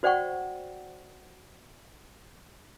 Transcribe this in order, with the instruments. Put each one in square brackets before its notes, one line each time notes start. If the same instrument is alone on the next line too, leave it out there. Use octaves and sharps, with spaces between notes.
[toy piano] F#4 C5 D5 F#5 G5 C#6